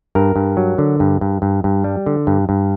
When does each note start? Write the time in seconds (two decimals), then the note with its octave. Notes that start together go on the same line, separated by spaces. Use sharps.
0.15 G2 A#4
0.36 G2
0.57 F#3
0.78 D3
1.00 G2
1.21 G2
1.42 G2
1.64 G2
1.84 G3
2.06 D3
2.27 G2
2.49 G2